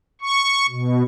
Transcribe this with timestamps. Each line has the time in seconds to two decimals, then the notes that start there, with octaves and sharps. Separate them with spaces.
0.21 C#6
0.69 B2